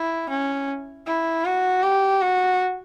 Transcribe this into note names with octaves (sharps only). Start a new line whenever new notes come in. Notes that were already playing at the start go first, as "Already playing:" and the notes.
Already playing: E4
C#4
E4
F#4
G4
F#4